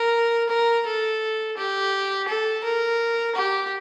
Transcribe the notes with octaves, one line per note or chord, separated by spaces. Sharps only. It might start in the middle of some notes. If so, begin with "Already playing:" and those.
Already playing: A#4
A#4
A4
G4
A4
A#4
G4